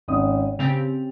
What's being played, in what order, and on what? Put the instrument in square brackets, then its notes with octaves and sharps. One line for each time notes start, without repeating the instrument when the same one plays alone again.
[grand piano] G#1 C#4 D#6
[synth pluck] C#3 C4 G4 [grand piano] G5 A6 F7